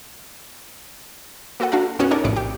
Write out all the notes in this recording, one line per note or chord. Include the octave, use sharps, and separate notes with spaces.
A#3 F#4 A4 B4 F#5
D4 F#4 A4 F5 A#5
B1 F#2 B3 C#4 F#4 F#6
D#4 G4 A4 A#4 C#5 D5
A#1 A2 C3 D5 C#7
G4